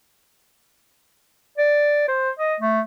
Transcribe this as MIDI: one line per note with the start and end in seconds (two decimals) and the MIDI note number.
1.58 2.07 74
2.08 2.30 72
2.39 2.55 75
2.60 2.81 57